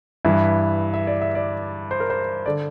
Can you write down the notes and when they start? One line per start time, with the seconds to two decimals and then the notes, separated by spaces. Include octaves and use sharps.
0.25 G2 E3 E4
0.94 E5
1.07 D5
1.22 E5
1.35 D5
1.91 C5
2.00 A#4
2.10 C5
2.46 D3 D5